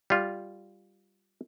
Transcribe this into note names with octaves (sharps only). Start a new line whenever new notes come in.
G3 F4